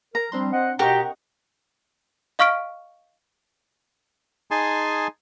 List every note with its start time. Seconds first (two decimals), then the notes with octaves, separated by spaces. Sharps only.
0.15 A#4 A#5
0.32 F3 G3 C4 D4 C6
0.53 C5 D#5 F#5
0.79 B2 G4 A#4 D#5 F#5 G5 A#5 C#6
2.39 D#5 F5 C#6 F6 B6 D7
4.51 D#4 G#4 G#5 A5 C6